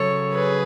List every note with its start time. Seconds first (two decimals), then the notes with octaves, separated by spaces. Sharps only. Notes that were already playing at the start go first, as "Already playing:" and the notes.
Already playing: C#3 F#3 A4 C#5
0.33 G#4 B4